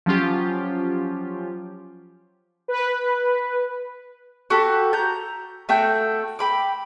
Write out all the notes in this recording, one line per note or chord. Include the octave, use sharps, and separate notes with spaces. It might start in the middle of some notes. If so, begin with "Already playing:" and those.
F3 F#3 C#4 F4 G4
B4
F#4 G4 A4
A#5 G6
A3 F#4 A4 G5
G5 B5 D6